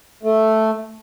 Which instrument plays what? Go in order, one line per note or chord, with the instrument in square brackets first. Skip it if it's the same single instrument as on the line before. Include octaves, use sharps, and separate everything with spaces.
[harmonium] A3